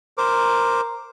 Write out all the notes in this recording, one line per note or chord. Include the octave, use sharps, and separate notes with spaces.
A#4 C5 D6